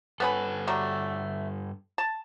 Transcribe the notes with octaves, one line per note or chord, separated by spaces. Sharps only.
G2 B3 C#4 A4 B4
F#3 G3 A3
A5